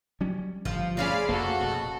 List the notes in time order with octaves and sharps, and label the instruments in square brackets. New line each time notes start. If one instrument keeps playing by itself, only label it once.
[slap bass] F#3 G3 C#4
[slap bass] G1 [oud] F3
[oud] C4 C#4 G#4 [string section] D5 F5 B5
[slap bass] F1 [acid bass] A#3 [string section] F#4 A4
[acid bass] B2